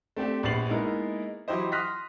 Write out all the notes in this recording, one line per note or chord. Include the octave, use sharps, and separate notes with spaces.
A3 C4 D4 G4
A#1 G2 B3 A6 C7 F#7
G#3 A#3 B3 D#4 E4 A#4
E3 F#3 E4 G4 C5 D#5
C6 D#6 F6 F#6 A#6 B6